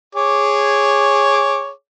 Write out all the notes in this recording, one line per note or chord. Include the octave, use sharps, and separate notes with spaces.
G#4 C#5 D6